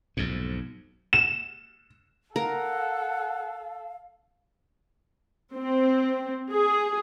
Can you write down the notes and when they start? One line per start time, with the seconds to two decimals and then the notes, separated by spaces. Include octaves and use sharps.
0.17 B1 F2 G#2
1.13 E7
2.36 A4 A#4 F5 F#5
5.55 C4
6.51 G#4